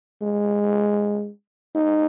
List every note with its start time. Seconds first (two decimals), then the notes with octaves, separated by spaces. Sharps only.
0.22 G#3
1.75 D#4